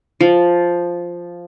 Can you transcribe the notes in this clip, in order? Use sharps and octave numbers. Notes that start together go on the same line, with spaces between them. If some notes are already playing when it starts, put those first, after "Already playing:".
F3